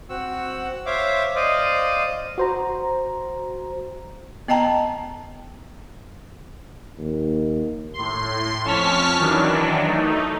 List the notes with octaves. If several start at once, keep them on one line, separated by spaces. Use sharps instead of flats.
C4 F#4 F#5 E6
C5 C#5 E5 F5 D6
C5 D5 D#5 F5
F#4 C5 A#5
B3 D#5 G5 A5 A#5
D#2
A2 C6
F2 C#4 A5 C#6 F6 B6
D#3 E3 F#3 D4
A3 D#4